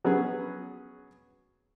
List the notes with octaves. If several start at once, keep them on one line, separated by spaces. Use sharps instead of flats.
F#3 B3 C#4 G#4